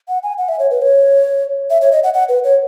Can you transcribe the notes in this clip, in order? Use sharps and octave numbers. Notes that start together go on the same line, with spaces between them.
F#5
G#5
F#5
E5
C#5
B4
C#5
E5
C#5
D#5
F#5
F#5
B4
C#5